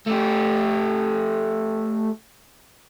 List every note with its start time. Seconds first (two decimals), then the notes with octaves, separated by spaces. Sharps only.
0.07 A3 G4